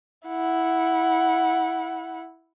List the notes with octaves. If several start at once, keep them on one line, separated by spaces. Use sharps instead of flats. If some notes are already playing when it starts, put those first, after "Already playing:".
E4 F#5